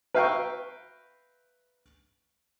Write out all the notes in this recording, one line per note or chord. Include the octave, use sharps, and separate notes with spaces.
B4 E5 F5 G5 A#5 C#6